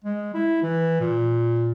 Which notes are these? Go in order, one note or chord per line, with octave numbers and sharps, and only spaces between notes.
G#3
E4
E3
A#2